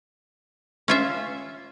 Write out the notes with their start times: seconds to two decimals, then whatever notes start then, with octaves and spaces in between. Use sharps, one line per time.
0.88 C#4 F4 E5